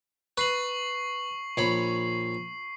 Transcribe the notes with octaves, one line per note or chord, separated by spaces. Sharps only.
B4 C#6 C7 F#7
A#1 C#5 B5 C7